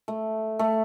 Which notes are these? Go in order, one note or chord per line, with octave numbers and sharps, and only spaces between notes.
A3
A3